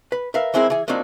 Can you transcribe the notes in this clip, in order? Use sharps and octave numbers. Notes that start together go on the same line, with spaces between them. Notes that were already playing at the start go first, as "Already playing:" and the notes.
B4
A#4 B4 E5 F5
E3 G#3 C4 E4 G#4 A#4
E3 G#4
F3 F#3 A#3 C4 D4 D#4